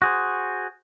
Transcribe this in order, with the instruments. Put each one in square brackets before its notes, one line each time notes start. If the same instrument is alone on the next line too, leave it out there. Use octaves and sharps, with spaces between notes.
[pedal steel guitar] F#4 G#4 C5